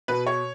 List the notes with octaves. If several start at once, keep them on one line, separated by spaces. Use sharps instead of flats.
B2 B4
C#5